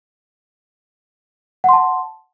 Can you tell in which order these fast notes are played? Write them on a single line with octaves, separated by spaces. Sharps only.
F#5 C6 A5